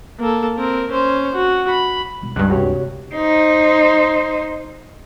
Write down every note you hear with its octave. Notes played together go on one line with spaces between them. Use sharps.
A#3 A4
C4 A#4
C#4 C5
F#4
B5
A1 B2
C#2 G2 G3 F4 F#6
D2 C3 F#4 G4 C#5
D#4 C5